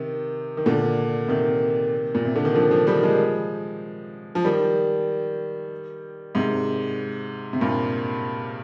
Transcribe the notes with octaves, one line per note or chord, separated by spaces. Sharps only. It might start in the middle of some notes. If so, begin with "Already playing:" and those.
Already playing: C3 D#3
D#3
A#2 D3
C3 D#3
A#2
C3
D3
D#3
D3 F3
D3 F3
D#3 G3
F3 G#3
F3
D#3 G3
G#2 C3
C3
G2 A#2